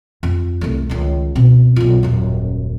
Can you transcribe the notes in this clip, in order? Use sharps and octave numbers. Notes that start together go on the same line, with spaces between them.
F2
C2 A3
C#2 D#3
B2 C4
B1 F4
D#1 F#2